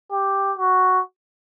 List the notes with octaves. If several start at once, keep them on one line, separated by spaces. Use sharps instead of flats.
G4
F#4